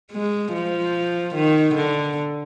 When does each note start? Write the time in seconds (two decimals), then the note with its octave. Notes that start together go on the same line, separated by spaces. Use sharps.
0.12 G#3
0.53 F3
1.35 D#3
1.75 D3